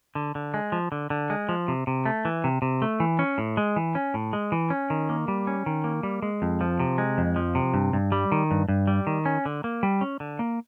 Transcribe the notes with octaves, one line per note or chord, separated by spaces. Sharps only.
D3
D3
G#3
F3
D3
D3
G#3
F3
C3
C3
A3
E3
C3
C3
A3
E3
C#4
A2
G#3
E3
C#4
A2
G#3
E3
C#4
D#3
A#3
G3
C#4
D#3
A#3
G3
G#3
F2
F3
C3
G#3
F2
F3
C3
G2
G2
G3
D#3
G2
G2
G3
D#3
C#4
D3
A#3
G3
C#4
D3
A#3